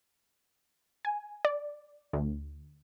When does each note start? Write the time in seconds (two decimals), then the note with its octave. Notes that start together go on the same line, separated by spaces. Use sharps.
1.05 G#5
1.45 D5
2.13 D2